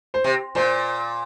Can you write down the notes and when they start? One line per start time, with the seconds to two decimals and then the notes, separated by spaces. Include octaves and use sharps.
0.14 C5
0.24 C3
0.55 A#2 C5